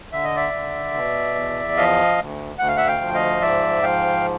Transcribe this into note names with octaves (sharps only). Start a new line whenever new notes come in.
D3 E5
D#5
D5 E5
D3
B2
E2
F3 D#5 F5
D2
D2 F#5
F5
E5 F#5
F5 G5
F3
D#5 F5
G#2 D5 E5
F3 F5 G5